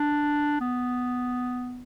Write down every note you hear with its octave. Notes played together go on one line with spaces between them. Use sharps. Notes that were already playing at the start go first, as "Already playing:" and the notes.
Already playing: D4
B3